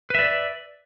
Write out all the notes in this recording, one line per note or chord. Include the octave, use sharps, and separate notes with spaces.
B4 D5 E5